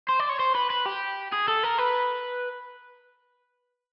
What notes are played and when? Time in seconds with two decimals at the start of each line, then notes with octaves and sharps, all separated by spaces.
0.09 C5
0.19 D5
0.29 C#5
0.39 C5
0.55 B4
0.70 B4
0.86 G4
1.32 G#4
1.48 A4
1.64 A#4
1.78 B4